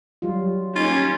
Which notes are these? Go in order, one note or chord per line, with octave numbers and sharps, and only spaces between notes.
F#3 G3 F4
A#3 C#4 D#4 F4 G4